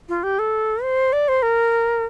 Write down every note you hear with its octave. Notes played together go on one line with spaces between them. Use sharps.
F4
G4
A4
C5
D5
C5
A#4